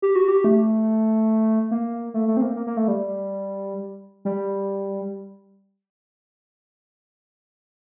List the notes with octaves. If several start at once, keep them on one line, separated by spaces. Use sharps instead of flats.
G4
F#4
G4
A3
A#3
A3
A3
C4
A#3
A#3
A#3
A3
G3
G3